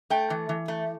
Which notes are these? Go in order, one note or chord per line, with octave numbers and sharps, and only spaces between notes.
A3 G5
E3
E3
A3